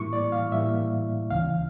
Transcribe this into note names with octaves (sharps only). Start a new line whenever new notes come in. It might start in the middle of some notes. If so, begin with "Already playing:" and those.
Already playing: A2 G3 A#3 E4 C#6
D5
F5
A2 G3 A#3 E4 E5
C#2 C#3 E3 F5